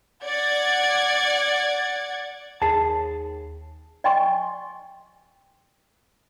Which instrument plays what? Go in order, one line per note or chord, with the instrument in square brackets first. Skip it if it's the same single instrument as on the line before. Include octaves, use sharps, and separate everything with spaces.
[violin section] D5 F#5 G#6 A6
[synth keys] D#2 [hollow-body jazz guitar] G#4 A5
[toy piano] D5 D#5 G5 G#5 C6 C#6